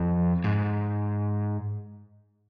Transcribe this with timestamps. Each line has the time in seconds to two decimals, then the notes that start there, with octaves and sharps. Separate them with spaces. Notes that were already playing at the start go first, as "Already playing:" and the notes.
Already playing: F2
0.44 G#2